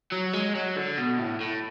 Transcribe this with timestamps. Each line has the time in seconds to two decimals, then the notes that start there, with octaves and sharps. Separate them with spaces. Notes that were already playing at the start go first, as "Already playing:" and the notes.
0.12 F#3
0.33 G#3
0.55 F#3
0.76 D3
0.98 B2
1.19 A2
1.41 A2